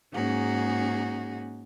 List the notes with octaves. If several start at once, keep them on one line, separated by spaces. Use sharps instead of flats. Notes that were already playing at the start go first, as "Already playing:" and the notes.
G#2 A#3 C#4 D#4 F#4 G#4